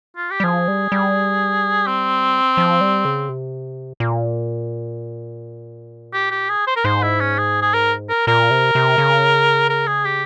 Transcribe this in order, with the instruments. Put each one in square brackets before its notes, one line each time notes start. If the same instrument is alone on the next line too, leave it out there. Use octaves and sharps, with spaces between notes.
[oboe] F4
G4
[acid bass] G3
[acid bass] F3 [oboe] G#4
[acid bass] G3
G3
[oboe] C4
[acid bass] F3
G3
C#3
C3
A#2
[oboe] G4
G4
G#4
C5
A#4
[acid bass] G#2 [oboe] C5
[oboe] E4
C#4
G#4
G#4
A#4
A#4
[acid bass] A#2 [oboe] A#4
[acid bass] C3
C3
C#3
[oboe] A#4
G#4
G4